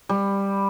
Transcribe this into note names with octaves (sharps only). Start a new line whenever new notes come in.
G3